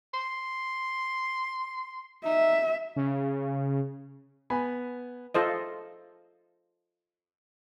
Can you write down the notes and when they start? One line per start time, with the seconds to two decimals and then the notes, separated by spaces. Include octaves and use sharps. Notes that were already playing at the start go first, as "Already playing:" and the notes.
0.14 C6
2.25 D#4 E5
2.96 C#3
4.50 B3 G#5 B5
5.35 F4 A4 C5 D#5